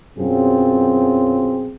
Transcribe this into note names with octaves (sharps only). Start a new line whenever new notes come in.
F#2 B2 F#3 C4 F4 G#4